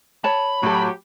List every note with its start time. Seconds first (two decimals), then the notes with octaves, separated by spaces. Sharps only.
0.24 C#5 A5 B5
0.63 A2 F#3 G4 A4